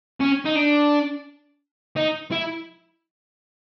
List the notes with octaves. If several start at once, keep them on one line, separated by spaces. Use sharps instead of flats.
C#4
D#4
D4
D#4
E4